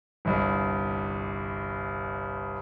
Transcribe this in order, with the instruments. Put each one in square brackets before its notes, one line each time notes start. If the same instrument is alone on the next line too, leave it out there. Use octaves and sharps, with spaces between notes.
[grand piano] G1 C2